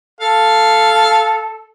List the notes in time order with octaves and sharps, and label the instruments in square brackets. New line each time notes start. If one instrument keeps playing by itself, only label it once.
[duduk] A4 [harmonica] F5